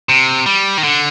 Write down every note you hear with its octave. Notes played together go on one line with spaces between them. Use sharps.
C3
G3
D#3
D3